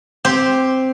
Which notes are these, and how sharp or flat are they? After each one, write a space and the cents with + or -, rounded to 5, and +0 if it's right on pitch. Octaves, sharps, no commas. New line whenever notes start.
C4 +0 G4 +0 C5 +0